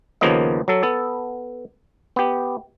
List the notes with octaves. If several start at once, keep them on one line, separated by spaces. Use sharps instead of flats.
D#2 C#3 F3 A#3 B3 D#5
F#3 A4
B3 A4
B3 G4